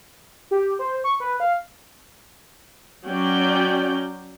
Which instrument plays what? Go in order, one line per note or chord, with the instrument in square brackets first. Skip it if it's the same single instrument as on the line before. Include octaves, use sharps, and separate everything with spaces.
[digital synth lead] G4
C5
C#6
B4
F5
[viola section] F#3 C#4 D5 G5